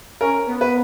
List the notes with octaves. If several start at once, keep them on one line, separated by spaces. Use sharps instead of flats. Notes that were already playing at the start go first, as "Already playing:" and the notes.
C#4 A#4
B3
B4